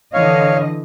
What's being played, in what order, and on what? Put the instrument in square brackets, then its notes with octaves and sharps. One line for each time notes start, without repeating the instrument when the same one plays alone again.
[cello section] D3 E3 D#5 [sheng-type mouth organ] C#5 F5